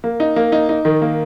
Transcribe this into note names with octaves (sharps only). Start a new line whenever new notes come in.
A#3
D#4
A#3
D#4
D#4
D#3
A#3